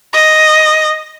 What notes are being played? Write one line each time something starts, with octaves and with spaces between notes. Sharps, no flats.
D#5